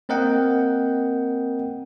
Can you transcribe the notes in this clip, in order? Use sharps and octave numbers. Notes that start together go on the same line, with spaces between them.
A#3 C4 A#4 D#5 F#5 G5